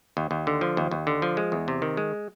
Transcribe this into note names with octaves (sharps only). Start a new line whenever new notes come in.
D#2
D#2
D3
F3
D#2
D#2
D3
F3
G#3
E2
C3
D#3
G#3